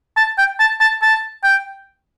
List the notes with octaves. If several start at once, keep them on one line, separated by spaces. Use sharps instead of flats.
A5
G5
A5
A5
A5
G5